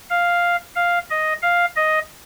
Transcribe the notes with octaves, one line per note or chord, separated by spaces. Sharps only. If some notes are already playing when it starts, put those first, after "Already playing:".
F5
F5
D#5
F5
D#5